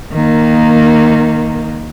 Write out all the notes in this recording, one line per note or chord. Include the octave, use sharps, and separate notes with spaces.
D#3 A#3